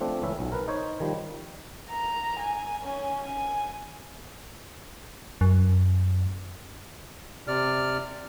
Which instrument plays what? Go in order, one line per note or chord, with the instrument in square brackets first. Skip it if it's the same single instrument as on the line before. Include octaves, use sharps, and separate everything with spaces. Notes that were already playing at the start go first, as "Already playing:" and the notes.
[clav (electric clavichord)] F3 A3 C4 D4
C#2 E3 C#4 E5
B1
A#4 B4
D#4 C5 C#5
D#3 F3 G3
[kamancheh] A#5
G#5
C#4 G#5
G#5
[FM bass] F#2
[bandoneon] C3 D5 F6